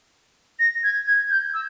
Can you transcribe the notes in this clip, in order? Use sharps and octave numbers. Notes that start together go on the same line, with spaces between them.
A#6
G#6
G#6
G6
E6